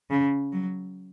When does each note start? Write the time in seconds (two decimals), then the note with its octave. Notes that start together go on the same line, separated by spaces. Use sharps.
0.10 C#3
0.52 F#3